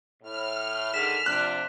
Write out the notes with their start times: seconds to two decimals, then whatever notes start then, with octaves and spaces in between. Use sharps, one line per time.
0.23 A2 F6
0.94 D3 D#3 G#3 B6 E7
1.26 C3 F3 D4 F#6